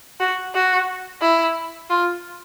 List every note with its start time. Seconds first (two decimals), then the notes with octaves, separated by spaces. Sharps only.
0.20 F#4
0.55 F#4
1.22 E4
1.90 F4